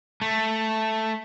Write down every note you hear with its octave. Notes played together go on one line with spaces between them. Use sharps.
A3